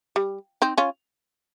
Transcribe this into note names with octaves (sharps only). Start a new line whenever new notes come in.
G3
C4 D#4
C#4 F4